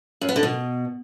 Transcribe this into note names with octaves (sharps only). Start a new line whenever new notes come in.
F#2
B3
D3
B2